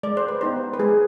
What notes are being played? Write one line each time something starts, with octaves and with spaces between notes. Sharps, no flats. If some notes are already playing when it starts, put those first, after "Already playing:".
G#3 D5
C5
B4
B3 D#4 G4 C5
B4
G#3 G#4